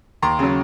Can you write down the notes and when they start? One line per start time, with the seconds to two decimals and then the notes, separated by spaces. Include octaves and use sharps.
0.22 D#2 A#5 C6
0.39 C#3 F#3